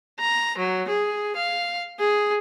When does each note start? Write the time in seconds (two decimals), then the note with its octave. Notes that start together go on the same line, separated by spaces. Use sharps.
0.20 A#5
0.58 F#3
0.89 G#4
1.37 F5
1.99 G#4